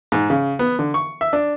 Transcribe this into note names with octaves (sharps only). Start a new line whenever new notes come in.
G#2
C#3
B3
D3
C#6
E5
D4